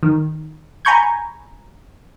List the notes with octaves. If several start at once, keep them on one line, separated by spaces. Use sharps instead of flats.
D#3
G#5 A#5 B5 C#6 G6 G#6